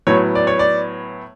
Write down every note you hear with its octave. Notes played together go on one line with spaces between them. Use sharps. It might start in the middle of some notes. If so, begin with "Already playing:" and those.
A2 F#3 B3 C#5
D5
C#5
D5